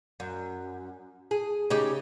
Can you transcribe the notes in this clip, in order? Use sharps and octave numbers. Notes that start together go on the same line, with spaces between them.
F#2
G#4
C#3 D#4 G4